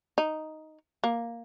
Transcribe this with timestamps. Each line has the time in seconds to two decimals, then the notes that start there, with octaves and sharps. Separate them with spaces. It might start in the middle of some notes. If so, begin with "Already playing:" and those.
0.18 D#4
1.04 A#3